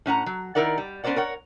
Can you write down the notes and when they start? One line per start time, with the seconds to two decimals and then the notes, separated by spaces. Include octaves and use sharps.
0.06 A2 C#4 F#5 A#5
0.26 F#3
0.55 D#3 A#3 E4 A#4 D5 F#5
0.78 G3
1.04 B3 C#4 A#4 C5 D5 F#5
1.16 A#4 C#5 F#5